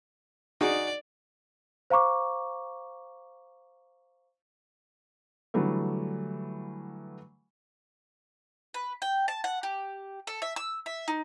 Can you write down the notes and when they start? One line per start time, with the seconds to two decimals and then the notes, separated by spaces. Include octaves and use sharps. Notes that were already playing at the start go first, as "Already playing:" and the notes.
0.61 D#4 F#4 G#4 D5
1.90 C5 F5 A#5 C#6 D6
5.54 D3 E3 F#3 G3 A3
8.74 B4
9.02 G5
9.28 A5
9.44 F#5
9.63 G4
10.27 A4
10.42 E5
10.56 E6
10.86 E5
11.08 D#4